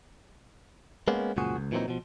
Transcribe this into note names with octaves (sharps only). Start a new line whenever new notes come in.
G#3 A#3 B3 C#4
C#2 F#2 A#2 F3 F#4 G#4
C#2
A#2 E3 F#3 G3 C4 D#4
B2 F3